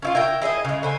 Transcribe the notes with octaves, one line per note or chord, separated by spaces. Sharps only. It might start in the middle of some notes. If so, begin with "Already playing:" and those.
C#4 E4 F4
E4 A#4 G5
E4 G#4 D5 D#5
C#3 G#3
D3 C5 G#5